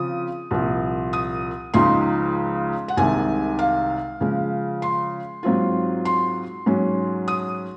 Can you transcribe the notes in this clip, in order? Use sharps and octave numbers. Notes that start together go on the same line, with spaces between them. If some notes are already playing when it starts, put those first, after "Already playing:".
Already playing: C#3 F3 C4 F4 D#6
C2 A#2 F3
D#6
C#2 C#3 F3 G#3 D#4 C6
F#5
C2 C3 D#3 G#3 G#5
F5
C#3 F3 G#3
C6
G#2 F#3 C4 F4
C6
G#2 F#3 C#4
D#6